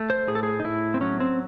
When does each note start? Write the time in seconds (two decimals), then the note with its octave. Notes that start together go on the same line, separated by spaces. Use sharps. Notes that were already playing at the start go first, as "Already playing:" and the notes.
Already playing: A3
0.10 C5
0.28 A2 G#4
0.35 A4
0.43 G#4
0.60 D#4
0.64 A2 E4
0.94 C4
1.01 F#3 C#4
1.20 C4